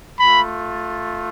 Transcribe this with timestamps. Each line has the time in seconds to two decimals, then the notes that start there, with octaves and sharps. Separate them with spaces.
0.20 A3 F4 B5